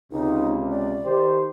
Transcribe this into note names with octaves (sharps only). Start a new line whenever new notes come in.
C#2 C3 D#4
D5
D#3 G4 C5